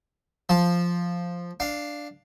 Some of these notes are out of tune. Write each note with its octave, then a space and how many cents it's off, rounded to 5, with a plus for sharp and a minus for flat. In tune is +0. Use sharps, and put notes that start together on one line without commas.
F3 +0 A5 -10
D4 +0 F5 +0